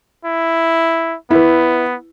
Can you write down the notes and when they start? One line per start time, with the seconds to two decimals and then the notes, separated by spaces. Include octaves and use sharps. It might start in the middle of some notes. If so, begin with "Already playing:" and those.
0.25 E4
1.31 B3 E4 B4